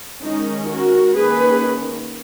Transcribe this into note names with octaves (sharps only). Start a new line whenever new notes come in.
D#3 G#3 C#4 D#4
F#4 A#4
D#3 A#3 C#4 G#4 B4